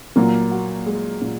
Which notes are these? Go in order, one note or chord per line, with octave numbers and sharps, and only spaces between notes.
A#2 F#3 A#3
F#4
G#3
A#2